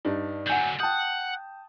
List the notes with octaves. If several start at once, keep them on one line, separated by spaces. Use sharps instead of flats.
G2 D4 D#4
D3 F#3 F#5 G#5 G6
F#5 G5 A5 D#6 G6